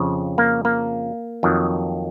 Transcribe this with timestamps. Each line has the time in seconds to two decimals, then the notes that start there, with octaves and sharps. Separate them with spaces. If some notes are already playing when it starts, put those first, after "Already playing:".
Already playing: F2 C#3 F3
0.38 A#3
0.65 A#3
1.43 F2 D#3 F#3